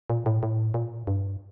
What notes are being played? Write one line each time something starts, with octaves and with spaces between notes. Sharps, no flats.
A#2
A2
A2
A#2
G2